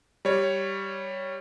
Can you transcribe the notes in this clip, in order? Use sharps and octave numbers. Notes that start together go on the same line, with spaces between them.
G3 C#5